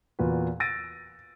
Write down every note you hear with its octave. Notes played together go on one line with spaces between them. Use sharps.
E2 A#2 F#4 B4
E6 A6 A#6 D7 D#7